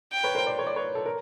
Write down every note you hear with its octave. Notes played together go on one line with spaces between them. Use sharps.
G5
B4 C#5
A#4 C5
C5 D5
C#5
D5
B4 C#5
A4
A#4